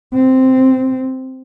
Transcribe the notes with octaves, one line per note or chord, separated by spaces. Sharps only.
C4